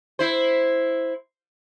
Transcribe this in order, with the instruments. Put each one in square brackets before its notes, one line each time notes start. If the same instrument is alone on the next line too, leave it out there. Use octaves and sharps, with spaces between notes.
[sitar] E4 C5